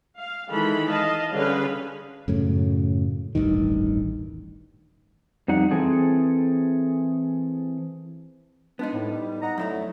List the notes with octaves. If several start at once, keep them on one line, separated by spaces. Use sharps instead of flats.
F5
D#3 E3 G#3 A4 B5
D#5 F5 A5
D3 G3 C#4 G#4 B4 F5
F#2 A2 C#3
D#1 A1 G2 D#3
F2 G3 D#4 F#5
E3 C4 G#4 A4
F3 G#3 B3 D4 D#4
A2
G3
D#5 F#5 A#5
F#2 D3 F#3 A3 E4 A#5